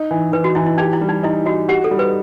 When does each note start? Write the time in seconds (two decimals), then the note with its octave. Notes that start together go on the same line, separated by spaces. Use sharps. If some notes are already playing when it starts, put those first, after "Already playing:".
Already playing: D#4
0.11 E3
0.32 E3 B4
0.44 F#4
0.55 E3 E4
0.66 E4
0.78 D#4 G4
0.93 E4
1.01 G3
1.09 D#4
1.23 D#4 E4
1.46 D#4 F#4
1.69 F#4 G4
1.84 A4
1.91 G3
1.99 B4